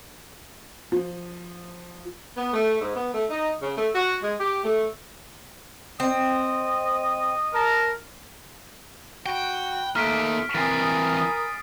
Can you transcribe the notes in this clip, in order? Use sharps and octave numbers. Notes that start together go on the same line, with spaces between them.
F3
B3
A3
G#2
B3
A3
D#4
C#3
A3
F#4
G#3
G4
A3
C4 D#5
A#4 A5 A#5
F#4 G5 B5 F#6
A3 A#3 D#4 F6 B6 D7
E3 C4 A#4 G#5 B5 D#6 A6 C7